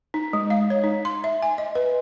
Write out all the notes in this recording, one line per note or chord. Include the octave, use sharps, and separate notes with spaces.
D#4
G#3
F5
C#5
D#4
C6
E5
G#5
D#5
B4